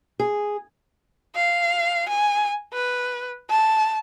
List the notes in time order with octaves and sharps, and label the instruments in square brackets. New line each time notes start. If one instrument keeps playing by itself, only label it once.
[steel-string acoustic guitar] G#4
[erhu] F5
G#5
B4
A5